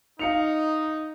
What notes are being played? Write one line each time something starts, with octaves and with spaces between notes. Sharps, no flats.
D#4 F5 C#7 F7